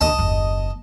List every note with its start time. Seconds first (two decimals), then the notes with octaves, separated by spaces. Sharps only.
0.01 D2 D#5 A5
0.19 F#1 D#2